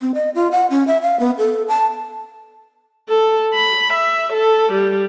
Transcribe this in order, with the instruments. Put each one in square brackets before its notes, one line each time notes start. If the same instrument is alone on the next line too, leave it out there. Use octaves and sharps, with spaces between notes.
[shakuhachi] C4
D#5
F4
F#5
C#4
E5
F5
B3
A4
A5
[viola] A4
B5
E5
A4
G3